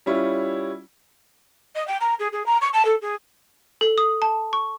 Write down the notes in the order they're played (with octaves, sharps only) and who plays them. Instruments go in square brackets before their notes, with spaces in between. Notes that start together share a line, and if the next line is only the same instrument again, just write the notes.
[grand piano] G3 C#4 E4 F4 C#5
[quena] D#5
G5
A#5
G#4
G#4
A#5
C#6
A5
A4
G#4
[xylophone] A4
D#6
A5
C#6